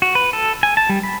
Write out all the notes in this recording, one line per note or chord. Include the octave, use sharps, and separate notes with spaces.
F#4
B4
A4
G#5
A5
G3
B5